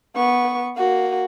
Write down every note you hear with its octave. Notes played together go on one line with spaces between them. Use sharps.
B3 C#6
A#3 F#4